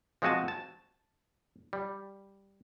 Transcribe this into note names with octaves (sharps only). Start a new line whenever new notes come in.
F3 G#3 C4 F#4 G#5 A5
A5
G3